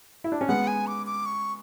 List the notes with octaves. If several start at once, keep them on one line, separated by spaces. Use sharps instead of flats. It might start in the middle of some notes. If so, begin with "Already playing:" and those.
E4
D4
C#4
G#3 B3 F#5
G#5
D6
D6
C#6